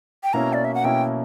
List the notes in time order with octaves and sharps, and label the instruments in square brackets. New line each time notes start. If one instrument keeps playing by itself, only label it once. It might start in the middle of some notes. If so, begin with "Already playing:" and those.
[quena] G5
[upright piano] B2 A#3 C#4 E4 [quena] A#5
[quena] D5
E5
F#5
[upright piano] B2 A#3 C#4 E4 [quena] G5